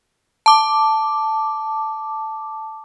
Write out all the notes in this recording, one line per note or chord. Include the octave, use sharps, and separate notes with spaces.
A5 D6